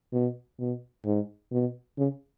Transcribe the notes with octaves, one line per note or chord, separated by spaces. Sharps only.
B2
B2
G#2
B2
C#3